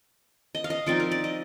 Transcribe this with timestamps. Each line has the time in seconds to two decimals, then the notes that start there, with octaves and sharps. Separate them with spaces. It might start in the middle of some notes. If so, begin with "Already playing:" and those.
0.55 D#5
0.64 F5
0.70 D#5
0.86 F3 C4 D#4 D5
1.00 A#4
1.11 D5
1.24 D#5